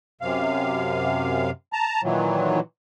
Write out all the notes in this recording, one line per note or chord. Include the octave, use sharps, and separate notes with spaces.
F#2 C3 F5
A5 A#5
A#2 D#3 E3 F#3